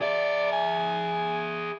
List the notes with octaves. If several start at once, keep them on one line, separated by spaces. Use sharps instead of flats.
G#4 D5 E5
G#5